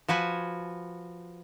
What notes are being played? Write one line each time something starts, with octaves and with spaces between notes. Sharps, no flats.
F3 F#4 B4 G#5